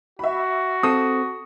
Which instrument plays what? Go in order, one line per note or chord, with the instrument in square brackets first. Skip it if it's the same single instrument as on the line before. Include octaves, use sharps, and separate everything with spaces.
[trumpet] F#4 [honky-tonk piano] E5 B5
[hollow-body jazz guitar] C4 A4 [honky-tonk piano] D#6